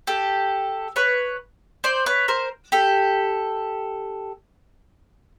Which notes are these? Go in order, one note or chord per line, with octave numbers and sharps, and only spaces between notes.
G4 A4
B4 C#5
C5 D5
B4 C#5
A#4 C5
G4 A4